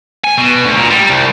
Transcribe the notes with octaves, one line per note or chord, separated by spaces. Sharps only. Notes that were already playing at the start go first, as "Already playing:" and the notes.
G#5
B2
D2
A#2
G3
C2